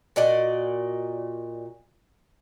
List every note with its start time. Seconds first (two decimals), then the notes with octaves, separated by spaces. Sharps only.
0.16 A#2 F#4 D5 D#5